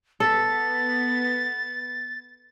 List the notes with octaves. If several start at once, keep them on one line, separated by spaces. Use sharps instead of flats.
B3 A4 A6